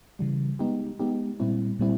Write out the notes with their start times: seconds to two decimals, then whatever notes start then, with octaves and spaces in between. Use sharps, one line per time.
0.19 C#3 E3 G3
0.59 G#3 B3 D#4 G4
0.99 G#3 B3 D#4 G4
1.40 A#2 G3 C4 E4
1.79 A#2 G3 C4 E4